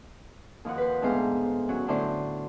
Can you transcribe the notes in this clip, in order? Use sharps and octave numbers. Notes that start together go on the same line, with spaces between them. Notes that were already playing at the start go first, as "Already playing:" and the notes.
D#2 F3 D#4 F#5
B4 C5
D2 G#2 B3 C5 F5
F#3 C#4 F#5
A2 D3 F#3 C5